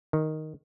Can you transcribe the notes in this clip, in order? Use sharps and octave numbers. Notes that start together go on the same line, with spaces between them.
D#3